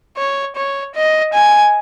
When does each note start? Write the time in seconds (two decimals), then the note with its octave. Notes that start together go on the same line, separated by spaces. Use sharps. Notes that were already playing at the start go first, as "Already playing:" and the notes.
0.18 C#5
0.56 C#5
0.95 D#5
1.33 G#5